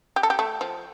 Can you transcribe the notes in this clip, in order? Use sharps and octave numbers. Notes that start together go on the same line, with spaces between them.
G4
A4
G4
A3
F3